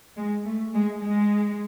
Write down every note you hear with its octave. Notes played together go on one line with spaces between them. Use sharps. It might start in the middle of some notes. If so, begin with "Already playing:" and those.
G#3
A3
G#3
G#3